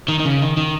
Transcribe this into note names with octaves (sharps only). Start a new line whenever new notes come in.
D#3
D#3
C#3
D#3
D#3